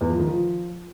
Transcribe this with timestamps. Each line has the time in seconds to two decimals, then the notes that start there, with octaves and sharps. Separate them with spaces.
0.01 E2
0.10 F3
0.19 D#3
0.29 F3